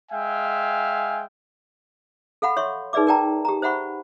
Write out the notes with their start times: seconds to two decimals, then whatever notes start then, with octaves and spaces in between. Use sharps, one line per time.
0.11 G#3 E5 F5 G5 G#5
2.42 A4 F5 F#5 B5
2.57 C#5 E5 C6 C#6
2.93 D#4 G#4 B4 D5 E5 D6
3.07 A#4 D5 G5 A5 A#5
3.45 G4 A#5
3.62 C5 E5 F#5 B5 C#6